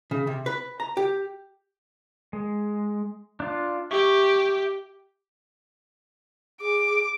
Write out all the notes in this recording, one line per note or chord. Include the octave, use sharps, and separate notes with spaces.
C#3
C3
B4
A#5
G4
G#3
D4 F4
G4 E5 C#6
G#4 D6